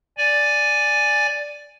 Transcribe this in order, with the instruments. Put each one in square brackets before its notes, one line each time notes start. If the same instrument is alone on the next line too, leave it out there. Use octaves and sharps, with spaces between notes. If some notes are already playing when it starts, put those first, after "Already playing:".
[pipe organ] D5 G#5